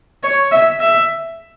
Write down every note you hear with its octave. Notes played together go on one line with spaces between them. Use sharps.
C#5
E5
E5